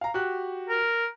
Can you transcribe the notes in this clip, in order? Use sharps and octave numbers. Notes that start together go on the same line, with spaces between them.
F5 A#5
F#4 G4 F#6
A#4